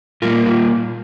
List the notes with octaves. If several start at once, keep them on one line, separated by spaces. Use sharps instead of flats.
A#2 G3 A#3 F4 A#4
F4